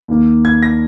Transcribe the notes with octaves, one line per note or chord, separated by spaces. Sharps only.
D#2 D#3 A#3
G#6
A#6